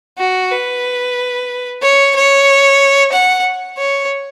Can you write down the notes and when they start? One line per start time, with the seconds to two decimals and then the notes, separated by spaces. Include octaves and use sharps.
0.18 F#4
0.51 B4
1.82 C#5
2.15 C#5
3.12 F#5
3.78 C#5